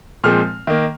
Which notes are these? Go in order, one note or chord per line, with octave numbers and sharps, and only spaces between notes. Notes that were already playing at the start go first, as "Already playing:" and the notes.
A#2 F3 G#3 C4 F6
D#3 A#3